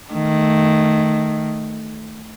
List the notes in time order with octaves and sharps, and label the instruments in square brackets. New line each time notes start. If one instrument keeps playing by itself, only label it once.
[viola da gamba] D#3 A3